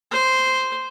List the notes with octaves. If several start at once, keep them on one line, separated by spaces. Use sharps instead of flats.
C5